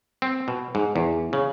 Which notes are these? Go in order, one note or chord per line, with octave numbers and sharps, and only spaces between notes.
C4
B2
G#2
E2
C#3